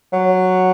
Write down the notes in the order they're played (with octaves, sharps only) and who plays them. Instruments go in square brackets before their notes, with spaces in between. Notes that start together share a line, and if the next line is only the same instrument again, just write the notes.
[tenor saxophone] F#3